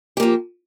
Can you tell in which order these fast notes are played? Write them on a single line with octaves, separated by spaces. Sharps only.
G4 A#3 F3